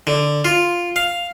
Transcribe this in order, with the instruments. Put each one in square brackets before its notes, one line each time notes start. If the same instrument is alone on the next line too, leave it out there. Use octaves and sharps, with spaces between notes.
[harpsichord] D3
F4
F5